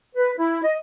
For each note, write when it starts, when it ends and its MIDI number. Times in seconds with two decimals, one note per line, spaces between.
0.15 0.31 71
0.37 0.62 64
0.63 0.75 75